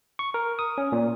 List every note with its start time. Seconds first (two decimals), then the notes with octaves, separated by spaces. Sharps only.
0.19 C#6
0.34 A#4
0.59 D#6
0.78 C#4
0.92 A#2